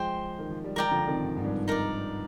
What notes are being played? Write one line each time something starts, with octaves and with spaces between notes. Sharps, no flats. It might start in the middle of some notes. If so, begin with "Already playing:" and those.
Already playing: F3 G#3 C5 G5 C6
D#3
F3
G3
F3 G#3 A#4 D5 G5 A#5
D3 F3
C3 D#3
G#2
G#2
G2
D#4 A#4 D5